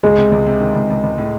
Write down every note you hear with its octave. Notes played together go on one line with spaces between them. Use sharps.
C#2 G#3
C3
C#2
C3
D#3
C#2
C#2
C#2
A2